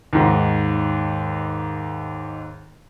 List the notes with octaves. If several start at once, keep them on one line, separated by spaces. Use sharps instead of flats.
D#2 G#2